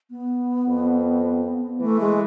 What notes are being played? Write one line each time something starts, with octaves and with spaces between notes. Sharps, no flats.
B3
F2
E3 A3
G#3